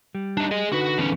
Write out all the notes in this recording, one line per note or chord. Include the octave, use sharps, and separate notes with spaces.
G3
D4 D#4
G#4 D#5
D3 D#4 F#4 B4
E2 C#4